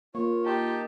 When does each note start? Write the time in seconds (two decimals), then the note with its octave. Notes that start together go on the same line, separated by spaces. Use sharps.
0.15 A#3 F4 C#5
0.46 D#4 G4 A5